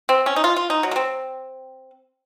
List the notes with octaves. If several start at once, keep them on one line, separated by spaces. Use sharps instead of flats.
C4
C#4
D#4
F4
F4
D#4
F#3
A#3
C4